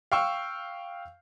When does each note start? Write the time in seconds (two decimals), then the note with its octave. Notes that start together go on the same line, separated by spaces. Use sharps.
0.12 F5 G5 C#6 E6